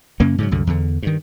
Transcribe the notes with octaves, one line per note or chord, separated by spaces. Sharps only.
F#2 C#3 A#3 C#4
G#2 C#3 F#3
C2 F#2 D3
E2 D3
G2 D#3